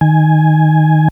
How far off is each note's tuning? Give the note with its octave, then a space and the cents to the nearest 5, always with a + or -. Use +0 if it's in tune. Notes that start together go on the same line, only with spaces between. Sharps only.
D#3 +0 G#5 +0